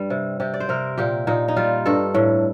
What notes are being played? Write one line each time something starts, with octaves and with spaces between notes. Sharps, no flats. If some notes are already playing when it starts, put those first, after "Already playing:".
Already playing: G2 G3
C3
C3 G4
D5
C5
C3 A#4
A#2 G4
A#2 D#4
D#4
G3 F4
G2 A4
A2